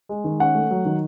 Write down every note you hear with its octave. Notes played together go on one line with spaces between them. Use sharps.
G#3
D#3
C#4 F#5
A3
F#3
D#3